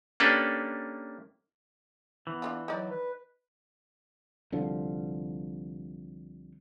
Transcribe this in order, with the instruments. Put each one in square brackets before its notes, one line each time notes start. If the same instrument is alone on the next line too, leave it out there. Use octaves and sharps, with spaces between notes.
[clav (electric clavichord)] A#3 C#4 D4 G4 A4 B4
[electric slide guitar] E3 [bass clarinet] B3
[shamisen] D4 E4 F4
[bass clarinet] F#3 [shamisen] D#4 D5
[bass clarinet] B4
[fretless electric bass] C2 D3 F3